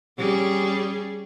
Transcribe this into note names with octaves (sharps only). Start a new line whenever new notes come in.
G3 C#4 G#4